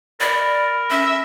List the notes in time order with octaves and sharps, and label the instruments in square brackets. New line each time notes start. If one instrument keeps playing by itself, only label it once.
[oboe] A#4 [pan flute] D5 [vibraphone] B5
[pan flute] C#4 [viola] E5